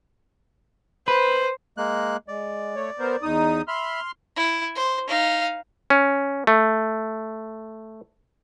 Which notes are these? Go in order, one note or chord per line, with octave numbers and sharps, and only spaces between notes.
B4 C5
G#3 A#3 F#6
G#3 D5
A3 C#5
B3 A#4 C5
E2 D#4 D#6
E5 B5 C6 F6
E4
C5
D#4 F5
C#4
A3